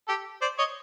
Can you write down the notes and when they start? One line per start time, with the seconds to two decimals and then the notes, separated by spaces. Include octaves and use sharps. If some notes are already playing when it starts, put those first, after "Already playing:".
0.08 G4 A4
0.41 C5 D5
0.58 C#5 D#5